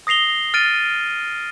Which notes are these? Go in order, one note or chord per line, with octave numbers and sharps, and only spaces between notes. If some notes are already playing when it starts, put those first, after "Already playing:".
D#6 A#6 C7 F7 G7
F6 A6 D7 D#7